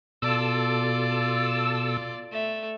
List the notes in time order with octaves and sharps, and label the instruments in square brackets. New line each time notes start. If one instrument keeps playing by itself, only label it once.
[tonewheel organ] B2 A4 E6 [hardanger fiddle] F4 D5
[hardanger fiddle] A3 E5